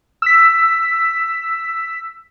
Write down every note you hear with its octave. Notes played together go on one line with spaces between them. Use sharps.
E6 B6